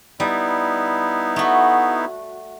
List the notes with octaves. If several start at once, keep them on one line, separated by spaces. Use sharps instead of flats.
G3 B3 D#4 E4
A3 F#4